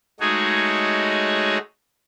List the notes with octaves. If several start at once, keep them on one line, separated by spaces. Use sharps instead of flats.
G#3 A3 D#4 F#4 G#4 C#5